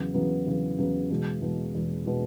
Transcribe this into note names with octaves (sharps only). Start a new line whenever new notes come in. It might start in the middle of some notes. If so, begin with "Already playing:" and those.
Already playing: E2 C#3 F#3 B3
E2 C#3 F#3 B3
E2 C#3 F#3 B3
E2 C#3 F#3 B3
E2 B2 G#3
E2 B2 G#3
E2 B2 G#3
B2 G#3